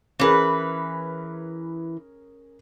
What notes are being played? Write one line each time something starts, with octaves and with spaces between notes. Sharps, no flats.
E3 C#4 G#4 A#4 B4